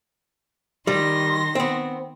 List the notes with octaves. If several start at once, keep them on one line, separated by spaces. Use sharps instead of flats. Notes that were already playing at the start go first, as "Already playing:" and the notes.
D#3 G3 C6 A#6
B3 C4